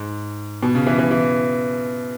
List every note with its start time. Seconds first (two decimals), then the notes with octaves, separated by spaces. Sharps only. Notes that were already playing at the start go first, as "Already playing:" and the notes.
Already playing: G#2
0.63 B2
0.75 C#3
0.87 E3
0.98 E3
1.11 E3